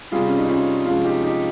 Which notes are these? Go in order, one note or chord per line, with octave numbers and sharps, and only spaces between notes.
C3 G3 F4 G#4
C#4
D#4
C#4 F4
C3 F3 G#3 C#4 F4
D#4 G4
D#4 G4